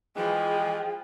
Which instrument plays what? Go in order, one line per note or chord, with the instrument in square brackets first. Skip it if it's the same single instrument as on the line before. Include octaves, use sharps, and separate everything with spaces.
[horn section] E3 G#3 [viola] F3 G#4 [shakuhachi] G5